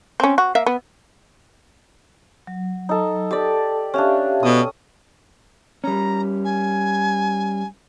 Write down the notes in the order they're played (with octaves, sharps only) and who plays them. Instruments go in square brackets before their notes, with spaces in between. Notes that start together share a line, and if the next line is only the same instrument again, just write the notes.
[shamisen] C4 C#4
F#4
A#3 E5 F5
B3
[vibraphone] F#3
[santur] D#4 A4
[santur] G4 D5 [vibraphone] A4 G5 A5
[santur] C#4 D4 [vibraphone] G4 E5 F5
[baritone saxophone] B2 [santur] A4 D#6
[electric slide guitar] G3 C#4 [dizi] A#5
[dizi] G#5